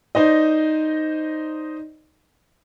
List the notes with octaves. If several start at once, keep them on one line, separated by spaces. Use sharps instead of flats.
D#4 C5 D5 D#5